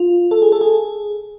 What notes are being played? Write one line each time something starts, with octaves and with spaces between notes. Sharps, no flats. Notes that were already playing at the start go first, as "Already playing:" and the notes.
Already playing: F4
A4
G#4
A4
G#4